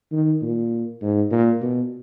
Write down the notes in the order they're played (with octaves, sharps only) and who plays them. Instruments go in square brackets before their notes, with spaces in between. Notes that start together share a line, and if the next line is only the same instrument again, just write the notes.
[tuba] D#3
A#2
G#2
A#2
B2